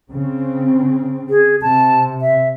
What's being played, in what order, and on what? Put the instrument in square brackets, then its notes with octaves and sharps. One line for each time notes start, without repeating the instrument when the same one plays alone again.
[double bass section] C#3 C4
[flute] G#4
[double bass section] C3 [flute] A5
[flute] E5